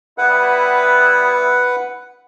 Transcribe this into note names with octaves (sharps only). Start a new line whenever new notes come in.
G3 B3 E4 B4 F#5